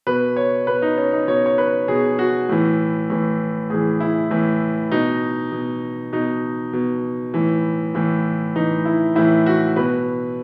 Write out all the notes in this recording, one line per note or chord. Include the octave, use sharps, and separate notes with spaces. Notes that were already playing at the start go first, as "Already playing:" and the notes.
B2 B4
C#5
B2 B4
D#4
C#4
D#4
B2 C#5
C#5
B4
B2 G#4
F#4
A2 E3
A2 E3
A2 E3 G#4
E4
A2 E3
B2 D#4
B2
B2 D#4
B2
A2 E3
A2 E3
A2 E3 D#4
E4
A2 E3 E4
F#4
B2 B4